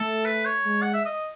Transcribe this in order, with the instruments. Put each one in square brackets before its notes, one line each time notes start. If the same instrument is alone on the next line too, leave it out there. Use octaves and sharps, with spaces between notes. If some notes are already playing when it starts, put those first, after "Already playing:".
Already playing: [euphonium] A3 [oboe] A4
[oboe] B4
C#5
[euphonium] G#3
[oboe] F#5
E5
D#5